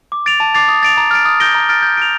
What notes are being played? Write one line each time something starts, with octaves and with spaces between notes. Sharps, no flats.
D6
A6 D7 F7
A5
D6 A6 C7 F7
D#6
A6 D7 F7
A#5
F6 A6 D7
D#6
G6 A#6 D7 G7
A#5
F6 A6 D7
G6
D7 F7